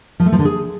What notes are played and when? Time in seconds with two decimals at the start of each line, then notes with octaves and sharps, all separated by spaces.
0.20 F3
0.26 A3
0.32 F3
0.39 D3
0.45 G#4